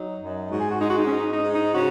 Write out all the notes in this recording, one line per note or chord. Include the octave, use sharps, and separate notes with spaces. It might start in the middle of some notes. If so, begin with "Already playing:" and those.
Already playing: F#3 D#4
F#2
G#2 F#4
G#4
F#4
G#3 D#4
F#4
D#4
C#4
G#2 D#4
D#4
G#2
D#4
C#3 F#4